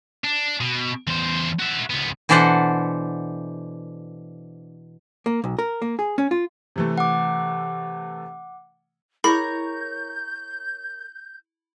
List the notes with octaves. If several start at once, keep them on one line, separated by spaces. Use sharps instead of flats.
D4
B2
E2 C5
F#4 E5
C#2 B3
B2 E3 D4 A4 C5 F#5
A#3
B1
A#4
A#3
G#4
C#4
F4
C3 E3 A3
F#5 D6
E4 G#4 A#4 C#5 D#5 A#5 B5 G6